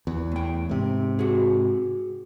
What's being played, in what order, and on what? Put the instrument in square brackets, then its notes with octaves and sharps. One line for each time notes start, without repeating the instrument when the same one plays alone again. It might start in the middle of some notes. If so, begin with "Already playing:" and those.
[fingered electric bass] E2
[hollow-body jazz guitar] A2 G5
[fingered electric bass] G#2 C3
[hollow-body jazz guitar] F#4 G#4